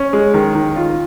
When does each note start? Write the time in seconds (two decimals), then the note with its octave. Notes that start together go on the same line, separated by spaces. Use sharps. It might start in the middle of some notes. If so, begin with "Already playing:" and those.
Already playing: C#4
0.13 G#3
0.34 D#3
0.55 D#3
0.76 F4